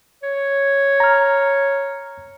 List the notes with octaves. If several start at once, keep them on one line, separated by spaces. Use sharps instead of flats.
C#5
A#5 F6